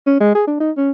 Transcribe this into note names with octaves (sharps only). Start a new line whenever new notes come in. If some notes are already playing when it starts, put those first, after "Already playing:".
C#4
G#3
G#4
D4
D#4
C#4